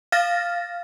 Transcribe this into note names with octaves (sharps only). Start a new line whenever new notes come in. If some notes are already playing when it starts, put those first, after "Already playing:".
F5 F6 A6 A#6